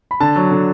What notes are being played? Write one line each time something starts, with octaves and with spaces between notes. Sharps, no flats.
B5
D3 A5
F#3
D3